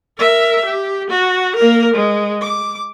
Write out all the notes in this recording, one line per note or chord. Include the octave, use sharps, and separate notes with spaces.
A#4 E5
G4
F#4
A#3 A#4
G#3
D6